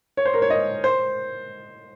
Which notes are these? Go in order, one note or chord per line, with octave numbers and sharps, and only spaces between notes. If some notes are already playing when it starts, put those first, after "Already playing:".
C#5
C5
A#4
C#5
D#5
C5